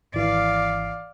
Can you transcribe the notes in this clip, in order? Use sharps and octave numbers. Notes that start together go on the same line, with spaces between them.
G#1 E3 D5 F5